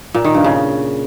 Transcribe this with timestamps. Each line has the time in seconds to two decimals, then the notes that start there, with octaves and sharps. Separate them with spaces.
0.14 A#2
0.24 D#3
0.34 G2
0.44 C#3